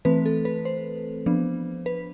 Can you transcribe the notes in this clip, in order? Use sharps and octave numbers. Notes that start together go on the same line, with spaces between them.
E3 A3 C4 B4
A4
B4
C5
F3 B3 D4
B4